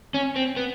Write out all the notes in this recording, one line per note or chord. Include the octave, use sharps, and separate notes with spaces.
C#4
C4
B3